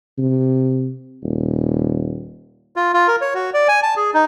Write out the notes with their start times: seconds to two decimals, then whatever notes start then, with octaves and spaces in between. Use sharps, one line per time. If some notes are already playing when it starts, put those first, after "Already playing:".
0.18 C3
1.23 D#1
2.76 F4
2.94 F4
3.08 A#4
3.21 C#5
3.35 F#4
3.54 D5
3.68 G#5
3.83 A5
3.97 G#4
4.14 D#4